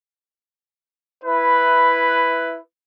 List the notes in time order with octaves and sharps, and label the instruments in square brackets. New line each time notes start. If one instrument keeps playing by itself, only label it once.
[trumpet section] E4 B4